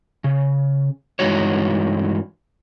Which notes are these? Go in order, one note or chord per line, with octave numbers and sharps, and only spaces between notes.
C#3
G2 E3 G#3 D#4 F#4 C#5